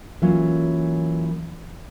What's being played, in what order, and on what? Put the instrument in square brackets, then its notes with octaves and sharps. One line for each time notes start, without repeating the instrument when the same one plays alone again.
[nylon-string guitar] E3 F#3 A#3 C#4 F4